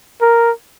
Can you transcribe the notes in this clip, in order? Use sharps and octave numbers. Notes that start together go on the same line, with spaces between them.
A#4